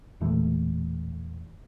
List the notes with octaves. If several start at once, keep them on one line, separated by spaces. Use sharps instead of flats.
E1 A#2 E3 A3